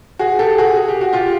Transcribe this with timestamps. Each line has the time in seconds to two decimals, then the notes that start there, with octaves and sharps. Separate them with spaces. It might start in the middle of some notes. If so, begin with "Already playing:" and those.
0.19 F#4 G#4
0.39 G4 A4
0.58 F#4 G#4
0.76 G#4
0.89 G4
1.01 F#4
1.13 F4 G4